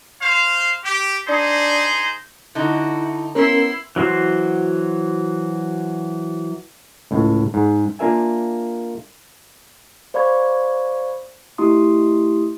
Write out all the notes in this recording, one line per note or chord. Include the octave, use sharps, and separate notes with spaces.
C5 F5
G4
D4 D#4 G#4 C5
D3 D#4 E4 F#4
B3 C#4 E4 A#4 C6
E3 F#3 F#4 C5
C#2 A2
G#2
A#3 D4 F4 A#4 E5 G#5
C5 D5 F5 B5 C#6 G#6
A3 E4 G4 C6 D#6